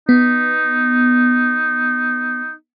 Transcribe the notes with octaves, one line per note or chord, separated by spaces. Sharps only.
B3 D#4